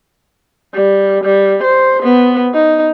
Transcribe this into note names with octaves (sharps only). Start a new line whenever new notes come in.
G3
G3
C5
B3
D#4